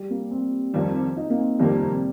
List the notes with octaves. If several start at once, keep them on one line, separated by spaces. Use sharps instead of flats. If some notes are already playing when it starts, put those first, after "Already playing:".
Already playing: G3
A#3
C4
F2 D#3 G3
D#4
A#3
C4
F2 D#3 G3 A#3
C3